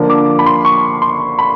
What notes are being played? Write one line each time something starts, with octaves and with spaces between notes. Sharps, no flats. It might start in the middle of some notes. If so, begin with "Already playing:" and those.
Already playing: D3 F3 A#3 D4
D6
B5
C6
C#6
C6
B5